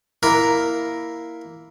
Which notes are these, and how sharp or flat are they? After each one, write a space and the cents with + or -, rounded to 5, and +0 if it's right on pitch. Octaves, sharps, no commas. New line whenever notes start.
A#3 +0 E4 +0 A#4 +0